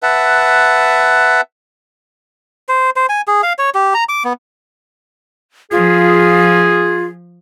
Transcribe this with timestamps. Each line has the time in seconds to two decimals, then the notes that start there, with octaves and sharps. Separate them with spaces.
0.03 B4 E5 F#5 A5
2.69 C5
2.96 C5
3.09 G#5
3.28 G#4
3.43 F5
3.59 C#5
3.75 G4
3.94 A#5
4.09 D6
4.25 B3
5.72 F3 F4 G#4